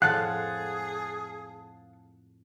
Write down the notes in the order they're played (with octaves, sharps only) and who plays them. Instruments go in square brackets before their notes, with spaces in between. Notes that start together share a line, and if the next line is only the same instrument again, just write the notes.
[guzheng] F2 A2 G#3 [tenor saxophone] G#4 [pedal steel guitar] F5 F#5 A5 [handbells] F#6